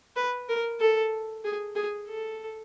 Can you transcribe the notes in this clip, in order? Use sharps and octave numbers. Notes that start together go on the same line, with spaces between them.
B4
A#4
A4
G#4
G#4
A4